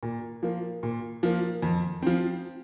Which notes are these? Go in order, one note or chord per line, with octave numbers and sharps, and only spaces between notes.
A#2
F3 A#3
A#2
F3 A#3
F2
F3 C4